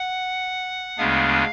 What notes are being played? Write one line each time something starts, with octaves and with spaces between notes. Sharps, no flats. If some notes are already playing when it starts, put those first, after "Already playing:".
Already playing: F#5
D2 C#3 G#3 B3 D4 F5